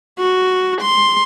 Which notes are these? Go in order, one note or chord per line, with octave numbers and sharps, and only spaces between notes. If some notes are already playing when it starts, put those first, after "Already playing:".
F#4
C6